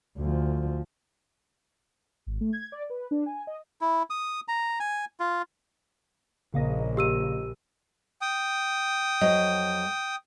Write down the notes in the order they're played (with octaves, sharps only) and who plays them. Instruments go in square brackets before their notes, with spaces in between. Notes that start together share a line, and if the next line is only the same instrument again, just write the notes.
[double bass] D2 F3
[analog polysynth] G#1
A3
G#6
D5
B4
D4
G#5
D#5
[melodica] E4
D#6
A#5
G#5
F4
[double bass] A#1 [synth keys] C#3 A#3 D#5
[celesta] G4 E6 D#7
[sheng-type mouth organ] G5 D#6
[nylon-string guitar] F2 F#3 D#5